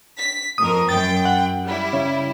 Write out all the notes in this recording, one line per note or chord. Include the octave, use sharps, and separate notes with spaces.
B6
F2 A#4 D#6
F#2 G5 A6
F#5
G3 E4
C#3